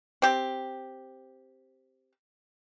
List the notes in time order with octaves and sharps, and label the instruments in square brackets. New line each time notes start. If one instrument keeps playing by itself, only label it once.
[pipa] C4 G4